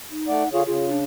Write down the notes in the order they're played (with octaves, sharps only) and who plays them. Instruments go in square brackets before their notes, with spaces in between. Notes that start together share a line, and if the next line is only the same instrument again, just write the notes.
[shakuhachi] D#4
[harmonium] A3 D5 [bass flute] F#5
[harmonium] D3 G#4 C#5 [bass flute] F4 [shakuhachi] F5
[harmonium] C#3 [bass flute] F4 [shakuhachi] G#4
[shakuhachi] D4